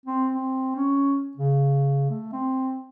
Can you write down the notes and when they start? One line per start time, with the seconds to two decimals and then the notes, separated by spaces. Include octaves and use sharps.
0.06 C4
0.34 C4
0.76 C#4
1.37 C#3
2.10 A3
2.32 C4